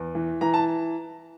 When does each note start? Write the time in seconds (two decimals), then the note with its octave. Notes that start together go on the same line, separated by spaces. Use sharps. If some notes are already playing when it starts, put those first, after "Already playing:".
Already playing: E2
0.15 E3
0.41 E3 A#5
0.54 A5